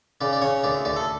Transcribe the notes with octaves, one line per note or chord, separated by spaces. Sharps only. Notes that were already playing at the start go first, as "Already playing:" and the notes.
C#3 D5
D5
C#3 C#5
D2 D5
D2 D5
A4